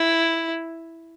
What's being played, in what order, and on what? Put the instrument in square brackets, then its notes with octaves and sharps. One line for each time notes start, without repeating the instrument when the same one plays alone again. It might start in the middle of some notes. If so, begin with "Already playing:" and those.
Already playing: [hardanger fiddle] E4